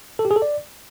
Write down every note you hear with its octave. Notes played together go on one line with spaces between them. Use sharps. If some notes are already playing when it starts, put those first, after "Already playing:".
A4
G4
G#4
A4
D5